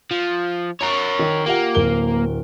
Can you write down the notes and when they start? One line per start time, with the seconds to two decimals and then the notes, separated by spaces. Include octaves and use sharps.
0.11 F3
0.81 A#4 C#5 A#5
1.19 D#3
1.46 A#3 F4 G4 F#5
1.75 D1 A#4 G7